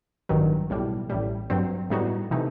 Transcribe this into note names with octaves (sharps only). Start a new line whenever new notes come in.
A1 G2 D#3 F#3
B1 A2 G3
A1 A2 G3
G2 F#3 C4
A2 G3 B3 D#4 F#4
C3 E3 A3 D#4